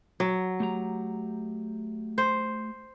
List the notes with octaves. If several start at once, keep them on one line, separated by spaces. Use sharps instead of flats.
F#3
A3 G4 A#5
C5